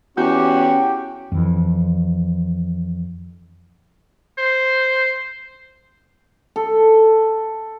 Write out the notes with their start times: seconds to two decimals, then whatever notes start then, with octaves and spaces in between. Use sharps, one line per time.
0.17 E2 C#4 F#4 G4
1.32 F2 E3
4.38 C5
6.56 A4